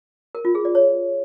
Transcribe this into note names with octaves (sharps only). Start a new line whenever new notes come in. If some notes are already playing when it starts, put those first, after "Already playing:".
A#4
F4
G#4
D5
C#5